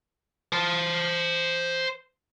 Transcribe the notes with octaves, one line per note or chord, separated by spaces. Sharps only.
C5 A5